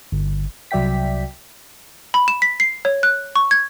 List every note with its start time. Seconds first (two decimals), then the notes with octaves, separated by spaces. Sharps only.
0.12 G1
0.71 C2 F#3 D5 E5 G5 B6
2.14 B5
2.28 E7
2.42 B6
2.60 C7
2.85 C#5
3.03 F#6
3.36 C#6
3.51 G#6